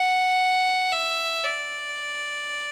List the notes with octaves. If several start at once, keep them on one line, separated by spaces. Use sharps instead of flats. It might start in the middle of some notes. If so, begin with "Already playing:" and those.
Already playing: F#5
E5
D5